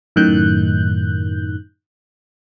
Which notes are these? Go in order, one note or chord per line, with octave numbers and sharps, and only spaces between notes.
F#2 A2 D#3 F#6 G6